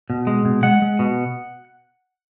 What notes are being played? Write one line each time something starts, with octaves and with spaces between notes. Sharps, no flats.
B2
G#3
B2
G#3 F#5
G#3
B2